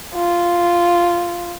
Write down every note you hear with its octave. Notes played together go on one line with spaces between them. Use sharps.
F4